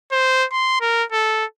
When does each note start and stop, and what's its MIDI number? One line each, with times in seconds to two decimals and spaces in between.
0.12 0.45 72
0.52 0.80 84
0.81 1.04 70
1.12 1.45 69